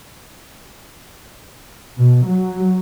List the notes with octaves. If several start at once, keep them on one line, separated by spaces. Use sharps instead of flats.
B2
F#3